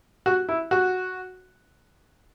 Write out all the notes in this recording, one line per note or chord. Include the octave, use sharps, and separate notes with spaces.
F#4
E4
F#4